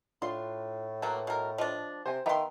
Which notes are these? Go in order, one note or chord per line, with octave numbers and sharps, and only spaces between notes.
A2 D4 F4 C6
F#3 A#3 B4 A5
B2 A#4
F3 D4 D#5
C3 C5 G#5
D#3 B3 E5 G5 A#5 C6